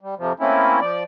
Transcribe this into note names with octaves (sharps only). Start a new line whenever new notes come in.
G3
F2 C3 F3
A3 A#3 C4 C#4 E4
F3 D5